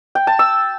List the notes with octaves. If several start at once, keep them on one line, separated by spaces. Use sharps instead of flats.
G5
A5
E6